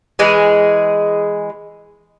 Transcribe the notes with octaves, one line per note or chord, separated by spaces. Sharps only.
E3 G#3 G#4